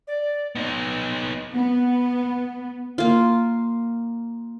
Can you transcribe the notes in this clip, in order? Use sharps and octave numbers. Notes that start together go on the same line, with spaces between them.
D5
B3 D#4
B3
A#3 F4